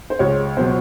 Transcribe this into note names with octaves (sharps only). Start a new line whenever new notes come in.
C5
C#2 C#5
B2 F#3 C5